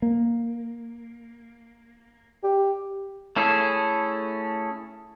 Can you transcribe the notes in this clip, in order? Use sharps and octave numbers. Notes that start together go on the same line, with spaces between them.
A#3
G4
A3 C#4 E4 G#4 A4